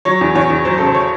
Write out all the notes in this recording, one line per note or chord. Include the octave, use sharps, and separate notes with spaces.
F#3 C#5
E2
E2 C#5
E2
F#3 C5
C#3 A4
C5
C#5